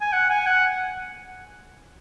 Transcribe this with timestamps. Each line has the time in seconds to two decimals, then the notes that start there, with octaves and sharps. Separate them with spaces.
0.01 G#5
0.13 F#5
0.30 G#5
0.47 F#5